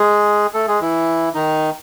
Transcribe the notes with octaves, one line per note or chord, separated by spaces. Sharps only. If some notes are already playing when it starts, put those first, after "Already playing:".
Already playing: G#3 G#4
A3 A4
G#3 G#4
E3 E4
D#3 D#4